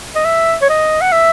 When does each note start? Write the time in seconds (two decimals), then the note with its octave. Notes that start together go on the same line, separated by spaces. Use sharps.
0.15 D#5
0.25 E5
0.62 C#5
0.69 D#5
1.01 F#5
1.12 E5